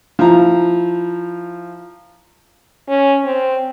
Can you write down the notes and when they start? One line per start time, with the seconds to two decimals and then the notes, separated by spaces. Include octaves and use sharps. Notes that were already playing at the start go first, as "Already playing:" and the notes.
0.19 F3 E4 A#5
2.89 C#4
3.25 C4